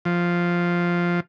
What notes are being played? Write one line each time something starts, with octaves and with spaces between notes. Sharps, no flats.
F3